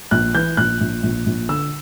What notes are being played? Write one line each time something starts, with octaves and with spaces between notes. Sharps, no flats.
A#1 F#6
E3 G6
A#1 F#6
A#1
A#1
A#1
D3 E6